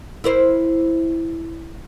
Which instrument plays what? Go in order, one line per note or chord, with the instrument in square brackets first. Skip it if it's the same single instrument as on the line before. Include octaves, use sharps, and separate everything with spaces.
[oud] E4 A#4 C5